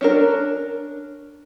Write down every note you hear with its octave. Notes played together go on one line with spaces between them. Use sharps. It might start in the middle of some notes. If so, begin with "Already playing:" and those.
C#4 D4 A#4